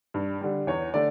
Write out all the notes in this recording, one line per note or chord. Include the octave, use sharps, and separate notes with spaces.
G2
D3 G3
E2 C#5
D3 A3 D5